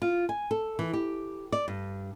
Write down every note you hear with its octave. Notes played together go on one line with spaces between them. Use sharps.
F4
G#5
A4
E3
G4
D5
G2